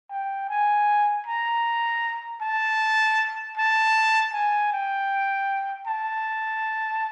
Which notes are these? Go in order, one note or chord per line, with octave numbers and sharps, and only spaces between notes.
G5
G#5
A#5
A5
A5
G#5
G5
A5